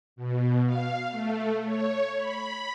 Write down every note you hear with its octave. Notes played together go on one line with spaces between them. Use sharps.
B2
F5
A3
C#5
B5